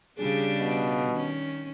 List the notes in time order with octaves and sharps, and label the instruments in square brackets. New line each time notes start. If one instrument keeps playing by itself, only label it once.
[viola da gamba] C#3 G3 D4 [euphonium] G#4
[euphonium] B2
[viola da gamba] D#3 C#4